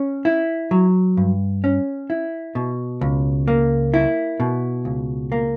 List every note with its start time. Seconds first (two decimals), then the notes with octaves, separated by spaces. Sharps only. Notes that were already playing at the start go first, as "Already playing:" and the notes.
Already playing: C#4
0.25 E4
0.71 F#3
1.17 G2
1.64 C#4
2.10 E4
2.55 B2
3.01 C#2
3.48 A#3
3.94 E4
4.40 B2
4.85 C#2
5.32 A#3